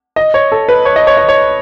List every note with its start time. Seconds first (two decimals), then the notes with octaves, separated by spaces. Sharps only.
0.16 D#5
0.34 C#5
0.52 A4
0.69 B4
0.85 C#5
0.96 D#5
1.07 C#5
1.17 D#5
1.29 C#5